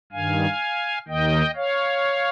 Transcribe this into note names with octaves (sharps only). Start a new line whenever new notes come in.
G2 D#3 F5 G#5
D#2 D#3 D#5 G5
C#5 F5